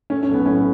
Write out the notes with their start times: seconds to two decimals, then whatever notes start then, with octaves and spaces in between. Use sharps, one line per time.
0.10 A3 C#4
0.23 C#4
0.29 B1 B3
0.46 A2 C#4